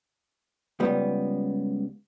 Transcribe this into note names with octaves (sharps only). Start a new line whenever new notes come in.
C#2 G3 B3